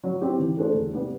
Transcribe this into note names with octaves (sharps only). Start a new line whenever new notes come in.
F#3
C4 E4 G4
E3
A3 D4 A4 C5
E2
C3 G3 B3